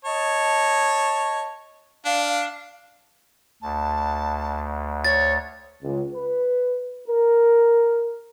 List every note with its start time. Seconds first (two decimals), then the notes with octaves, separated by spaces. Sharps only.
0.05 C#5 D#5 A5
2.05 D4 F5
3.62 D2 A5
5.05 C#5 A6
5.83 C#2
6.13 B4
7.08 A#4